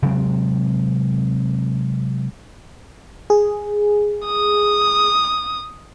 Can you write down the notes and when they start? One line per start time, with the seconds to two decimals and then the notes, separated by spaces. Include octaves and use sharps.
0.02 C3 F#3 G#3 C4
3.30 G#4
4.26 D#6